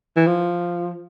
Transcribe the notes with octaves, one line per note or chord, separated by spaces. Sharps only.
E3
F3